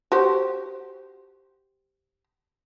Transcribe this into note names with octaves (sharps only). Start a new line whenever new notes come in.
F#4 G4 C5